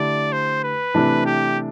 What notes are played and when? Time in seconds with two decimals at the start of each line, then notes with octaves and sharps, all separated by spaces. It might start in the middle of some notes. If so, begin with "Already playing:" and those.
Already playing: D3 A3 E4 G4 D5
0.32 C5
0.64 B4
0.94 C3 E3 A3 D4
1.26 G4